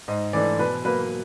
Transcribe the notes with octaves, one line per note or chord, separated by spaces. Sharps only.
G#2 D#5
E3 A3 D4 D5
B2 B4
F#3 A#3 B4